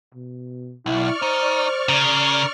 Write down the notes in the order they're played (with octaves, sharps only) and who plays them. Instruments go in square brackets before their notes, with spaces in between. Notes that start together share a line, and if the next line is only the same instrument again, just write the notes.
[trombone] B2
[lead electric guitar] B1 [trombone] E4 [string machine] D5 C#6 F6
[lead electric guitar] D#4 [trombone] C5
[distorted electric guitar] C#3 [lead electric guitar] A#4